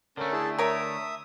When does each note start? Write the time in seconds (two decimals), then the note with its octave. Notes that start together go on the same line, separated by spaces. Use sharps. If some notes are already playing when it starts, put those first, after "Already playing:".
0.17 D3 A3 C#4 A#4
0.32 E4 G#4 A5
0.59 A#4 C#5 E5 D#6